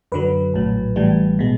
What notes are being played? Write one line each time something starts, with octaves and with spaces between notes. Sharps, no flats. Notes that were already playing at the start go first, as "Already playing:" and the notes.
F#2 D3 F#3 B4
A#1 A2 F#3
A1 A2 E3 G3
B2 G#3